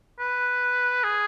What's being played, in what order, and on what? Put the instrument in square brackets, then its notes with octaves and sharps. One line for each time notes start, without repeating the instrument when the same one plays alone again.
[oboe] B4
G#4